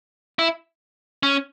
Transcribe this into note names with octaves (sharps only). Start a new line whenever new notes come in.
E4
C#4